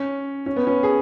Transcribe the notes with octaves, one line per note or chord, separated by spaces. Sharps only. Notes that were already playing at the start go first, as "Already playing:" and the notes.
Already playing: C#4
C#4
B3
C#4
G#4